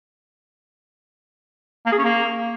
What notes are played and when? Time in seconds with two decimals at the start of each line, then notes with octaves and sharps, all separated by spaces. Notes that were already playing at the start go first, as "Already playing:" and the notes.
1.86 A#3
1.92 G#4
1.98 C#4
2.04 A#3